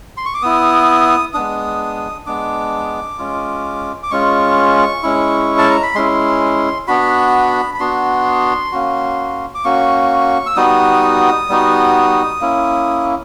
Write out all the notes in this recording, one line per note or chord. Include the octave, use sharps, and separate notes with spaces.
C6
C#6
D6
B3 E4 D#6
G#3 B3 D4 D#6
G#3 B3 D4 D6
G#3 C#4 F4
D6
G#3 C#4 F4 C#6
G#3 C#4 E4
A5
A#5
B5
G#3 C#4 E4 C6
B3 D4 F#4 B5
B5
B3 D4 F#4 C6
A#3 C#4 F#4
D6
A#3 C#4 F#4 C#6
E6
G3 B3 D#4 F#4 D#6
G3 B3 D#4 F#4
A#3 C#4 E4